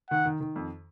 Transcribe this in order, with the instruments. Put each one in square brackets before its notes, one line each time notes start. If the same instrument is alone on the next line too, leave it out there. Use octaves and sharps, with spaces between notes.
[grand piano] D#3 [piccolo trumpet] F#5
[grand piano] D#3
D#3
F2